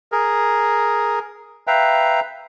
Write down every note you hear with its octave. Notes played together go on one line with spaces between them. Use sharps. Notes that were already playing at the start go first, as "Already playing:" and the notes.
G#4 A#4
B4 E5 F5 G5 A#5